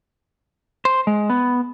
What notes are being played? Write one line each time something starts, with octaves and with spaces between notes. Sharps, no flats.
C5
G#3
B3